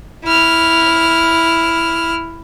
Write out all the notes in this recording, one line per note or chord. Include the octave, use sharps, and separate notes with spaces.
E4 F6